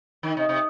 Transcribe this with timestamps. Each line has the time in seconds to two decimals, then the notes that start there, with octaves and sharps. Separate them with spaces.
0.23 D#3
0.37 C3
0.49 C3